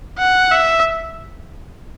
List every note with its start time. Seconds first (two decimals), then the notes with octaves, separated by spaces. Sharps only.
0.18 F#5
0.51 E5